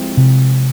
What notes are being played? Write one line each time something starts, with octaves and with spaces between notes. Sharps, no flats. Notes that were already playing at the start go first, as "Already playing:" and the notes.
Already playing: F3 G#3 C4 E4 G4
C3